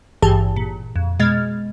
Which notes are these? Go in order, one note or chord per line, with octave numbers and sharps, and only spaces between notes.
G#1 G2 E3 G4 G#4 A5
A#2
F2
B2 G#3 D#5 F6 G#6 A6